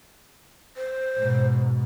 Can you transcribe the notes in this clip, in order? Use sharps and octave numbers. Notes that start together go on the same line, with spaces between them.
C5
G#2 B2